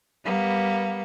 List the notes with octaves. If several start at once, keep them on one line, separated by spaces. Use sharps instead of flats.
G3 A#3 B3